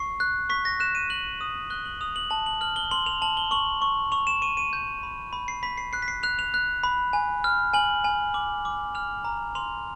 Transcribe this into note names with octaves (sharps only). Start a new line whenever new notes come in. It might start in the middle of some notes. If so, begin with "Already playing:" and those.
Already playing: C#6 C7
F#6
C#6 B6
A#6
F#6 E7
D#7
F#6 F#7
D#6
F#6 G7
F#7
D#6 F7
F#7
A5 F#7
F#7
F6 F#7
G7
C6 F#7
F7
A5 F#7
G7
C#6 F#7
C#6
C#6 F7
E7
C#6 D#7
D#7
G6
B5
B5
C7
B5 B6
C7
F#6 C7
B6
C7
F#6 F7
F7
F#6
B5
G#5
F6
G#5 F#7
G#5
D6 F#7
D6
F6 F7
A#5
C6 F7